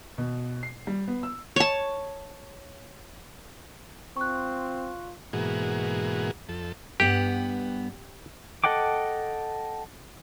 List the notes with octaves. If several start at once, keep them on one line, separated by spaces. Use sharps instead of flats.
B2
C7
G3
B3
E6
C#5 A5
C4 F4 C#6 F#6
G#2 B2 E3 A#3 F#4 G#4
F2 A4
G2 B3 G4 F#5
A4 D#5 F#5 G5 D6